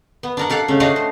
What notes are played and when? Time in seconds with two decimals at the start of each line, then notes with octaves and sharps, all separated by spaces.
0.23 B3
0.37 D4 A#4 F#5
0.50 G4 A4 F5 F#5
0.68 C#3 A3
0.80 D4 F#4 C#5 D#5 F5 F#5
0.96 C5